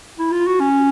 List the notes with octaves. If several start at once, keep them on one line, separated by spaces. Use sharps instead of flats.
E4
F4
F#4
C#4